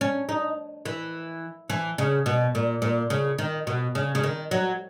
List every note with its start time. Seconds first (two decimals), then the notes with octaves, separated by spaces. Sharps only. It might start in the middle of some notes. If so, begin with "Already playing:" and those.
0.01 C#4
0.29 D#4
0.86 E3
1.70 E3
1.98 C#3
2.26 B2
2.55 A#2
2.82 A#2
3.10 C#3
3.38 D#3
3.67 B2
3.95 C#3
4.15 C#3
4.23 D#3
4.51 F#3